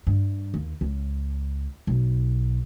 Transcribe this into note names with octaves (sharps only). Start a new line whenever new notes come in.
G2
D#2
C#2
B1